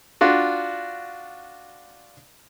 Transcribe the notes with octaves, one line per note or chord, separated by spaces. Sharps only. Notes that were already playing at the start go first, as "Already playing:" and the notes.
D4 F4 F#4